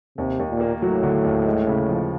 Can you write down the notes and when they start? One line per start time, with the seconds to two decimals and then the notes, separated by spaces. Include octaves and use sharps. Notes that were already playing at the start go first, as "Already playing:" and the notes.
0.18 D#2 C3
0.39 D#2
0.50 A#2
0.61 A#3
0.82 A2 F#3
1.03 D3
1.25 D#2
1.46 G#3
1.67 C#3
1.89 F3